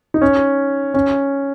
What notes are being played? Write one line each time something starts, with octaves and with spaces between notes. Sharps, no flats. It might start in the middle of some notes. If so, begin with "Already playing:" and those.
D#4
C#4
C#4